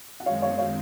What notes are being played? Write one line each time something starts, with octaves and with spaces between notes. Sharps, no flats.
F#5
F#2 D#3 G#3 C4 C#5 F5
C#5 F5
C#5 F5